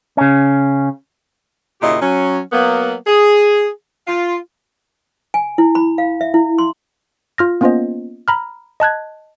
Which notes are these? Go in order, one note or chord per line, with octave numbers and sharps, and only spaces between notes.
C#3 C#4
D#2 A#2 C#3 E4 G4 D#5
F#3 C#4
F#3 A#3 B3
G#4
F4
G#5
E4
B5
F5
E5
E4
C6
F4 F6 A#6
A#3 B3 C#4 F4 C5 D#5
A#5 B5 F6
D#5 A5 F#6 G#6